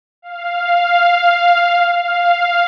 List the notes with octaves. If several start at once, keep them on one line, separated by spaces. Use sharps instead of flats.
F5
F5